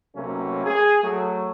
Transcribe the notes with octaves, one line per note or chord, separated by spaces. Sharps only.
B1 C3 F#3 A3 A#3 C#4
G#4
F#3 A3